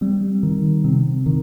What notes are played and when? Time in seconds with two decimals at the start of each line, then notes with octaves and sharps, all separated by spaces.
0.01 G3 C4
0.43 D#3
0.84 C3 C4
1.26 D#3